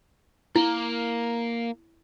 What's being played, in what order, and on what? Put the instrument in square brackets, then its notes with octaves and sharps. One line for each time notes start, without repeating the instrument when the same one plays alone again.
[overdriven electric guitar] A#3 [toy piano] E4